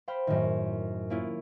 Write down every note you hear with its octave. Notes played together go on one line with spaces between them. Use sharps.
C5 F5 G5 B5
F#2 A2 D#3
A#3 C#4 E4 F4